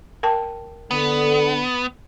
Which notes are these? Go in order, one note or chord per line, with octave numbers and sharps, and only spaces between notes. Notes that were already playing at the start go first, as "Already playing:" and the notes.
A#4 G5 A5
D3 B3 A4